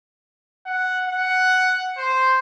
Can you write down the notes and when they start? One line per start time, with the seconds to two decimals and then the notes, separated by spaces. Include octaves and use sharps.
0.66 F#5
1.08 F#5
1.97 C5